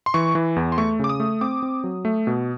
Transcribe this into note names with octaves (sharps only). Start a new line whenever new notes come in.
C6
E3 C#6
E3
E2
C6
A3 C#6
C#3 D6
D#6
A3
C4 D6
C4
F#3
A3
B2